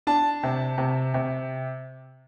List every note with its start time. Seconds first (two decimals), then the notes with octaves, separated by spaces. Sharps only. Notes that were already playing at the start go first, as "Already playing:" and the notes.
0.07 D4 A5
0.43 C3
0.78 C3
1.14 C3